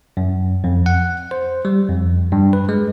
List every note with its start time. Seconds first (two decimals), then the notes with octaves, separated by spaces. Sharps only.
0.17 F#2
0.64 F2
0.86 F#5
1.31 C5
1.65 G3
1.89 F2
2.32 G2
2.53 B4
2.69 G#3